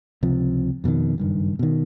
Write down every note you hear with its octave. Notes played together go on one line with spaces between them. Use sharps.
C#2 C3 F3
F2 B2 D3 D#3
F#1 G2 D#3
B2 D#3